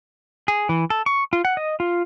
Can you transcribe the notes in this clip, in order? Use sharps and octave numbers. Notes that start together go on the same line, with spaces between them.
G#4
E3
A4
C#6
F4
F#5
D#5
F4